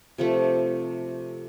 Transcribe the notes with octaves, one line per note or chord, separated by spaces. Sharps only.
C3 F3 A3